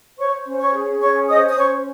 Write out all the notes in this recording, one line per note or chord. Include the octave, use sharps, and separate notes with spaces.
C5 C#5 C#6
C#4
C#5 C#6
G#4
C#4 C#5 C#6
C5 D#5 D#6
D#6
C#4 C#5 C#6